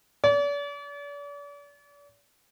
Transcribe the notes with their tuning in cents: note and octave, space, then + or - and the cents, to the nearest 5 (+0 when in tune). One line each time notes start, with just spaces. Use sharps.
D5 -40